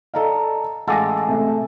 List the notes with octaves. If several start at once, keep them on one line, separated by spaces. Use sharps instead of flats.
A4 D5 D#5 F5 A5 A#5
A1 G#3 A4 F5 F#5 G#5 D6 A#6
C3 A3